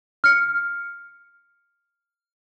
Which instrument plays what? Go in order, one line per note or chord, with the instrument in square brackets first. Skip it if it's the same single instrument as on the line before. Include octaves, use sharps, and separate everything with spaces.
[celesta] F6 C#7